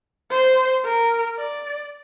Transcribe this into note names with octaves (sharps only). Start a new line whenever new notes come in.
C5
A#4
D5